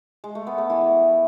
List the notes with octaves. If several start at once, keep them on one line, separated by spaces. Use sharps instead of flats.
G#3
A3
B3
A3
E3